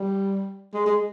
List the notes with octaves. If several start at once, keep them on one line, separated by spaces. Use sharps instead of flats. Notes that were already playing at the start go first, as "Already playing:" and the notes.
Already playing: G3
G#3
G#3